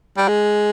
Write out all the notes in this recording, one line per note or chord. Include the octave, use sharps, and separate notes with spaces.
G3
G#3